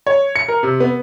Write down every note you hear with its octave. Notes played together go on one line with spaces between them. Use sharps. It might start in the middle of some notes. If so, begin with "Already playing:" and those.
C#5
C#7
A#4
C3
B3